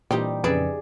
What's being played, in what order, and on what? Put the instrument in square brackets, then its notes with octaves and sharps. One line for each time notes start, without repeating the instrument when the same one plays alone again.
[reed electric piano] A#2 E3 G5 [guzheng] G3 D#4 G4 [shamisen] C4
[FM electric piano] F2 C#3 [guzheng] G#4 D5 E5 [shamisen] B4